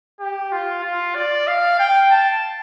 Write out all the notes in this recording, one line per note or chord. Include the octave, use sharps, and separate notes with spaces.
G4
F4
F4
D5
F5
G5
A5